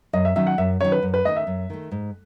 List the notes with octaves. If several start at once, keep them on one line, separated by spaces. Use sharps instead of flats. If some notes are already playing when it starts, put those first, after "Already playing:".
F#2 D#5
E5
D#3 F#3 C#4 E5
F#5
F#2 E5
D#3 F#3 C#4 C#5
B4
F#2
B4
D#3 A3 D#5
E5
F#2
D#3 A3
G#2